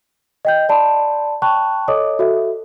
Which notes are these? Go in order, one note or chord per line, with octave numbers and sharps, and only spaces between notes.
D#5 G5 G6
D5 A5 B5 C6
G5 A5 B5 C#6 F#6
A4 C#5 D#5 D6 D#6
F#4 A4 E5